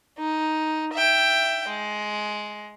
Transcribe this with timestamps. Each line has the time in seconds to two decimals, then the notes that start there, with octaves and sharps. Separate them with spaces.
0.19 D#4
0.94 E5 G5
1.68 G#3